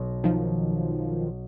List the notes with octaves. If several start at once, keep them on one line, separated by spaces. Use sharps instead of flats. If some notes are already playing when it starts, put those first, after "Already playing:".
Already playing: B1 B2
D#3 F3